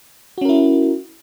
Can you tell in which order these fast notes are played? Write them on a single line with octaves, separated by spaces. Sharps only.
F#4 C#4 A#4 E4